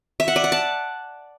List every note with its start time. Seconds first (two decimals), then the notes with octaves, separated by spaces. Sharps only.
0.20 E5
0.28 F#5
0.36 D5
0.44 F#5
0.52 A5